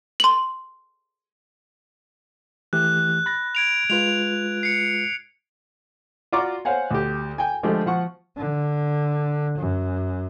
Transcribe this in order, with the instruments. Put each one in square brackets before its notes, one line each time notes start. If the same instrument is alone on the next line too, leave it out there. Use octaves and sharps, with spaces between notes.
[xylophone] C6 F#7
[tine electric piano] E3 A3 G4 [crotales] F#6
[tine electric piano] B5 A6 A#6
[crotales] G#6 D7 F7
[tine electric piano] G#3 F4 B4 [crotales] F7
[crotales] C7 C#7
[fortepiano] F4 F#4 D5 A#5 C#6 D6
C5 C#5 F5 F#5 G#5
D2 G4
G5 G#5
D3 F3 G#3 A3 G4
F3 F#5 C#6
[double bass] D3
F#2